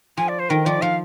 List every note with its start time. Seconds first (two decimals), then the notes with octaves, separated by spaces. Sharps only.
0.17 F3 G#5
0.28 D5
0.39 C5
0.50 D#3 A#4
0.66 F3 D5
0.82 F3 F5